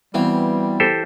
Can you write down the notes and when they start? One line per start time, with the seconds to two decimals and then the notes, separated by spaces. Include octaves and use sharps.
0.14 B2 E3 G3 C4 F5
0.80 G4 A4 C5